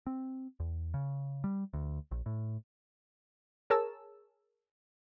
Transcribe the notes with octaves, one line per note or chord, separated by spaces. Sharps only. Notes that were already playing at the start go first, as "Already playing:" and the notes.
C4
E2
C#3
G3
D2
A#1
A2
G#4 A#4 C#5 A5 E6